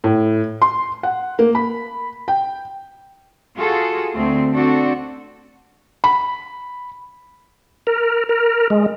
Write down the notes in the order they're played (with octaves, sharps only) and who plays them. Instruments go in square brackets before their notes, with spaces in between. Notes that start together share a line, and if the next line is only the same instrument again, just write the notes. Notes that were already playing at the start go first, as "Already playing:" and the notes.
[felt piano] A2
C6
F#5
A#3
B5
G5
[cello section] F4 F#4 G#4 A4
D2 A3 C4
C4 D4 F#4 A4
[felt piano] B5
[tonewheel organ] A#4
A#4
G#3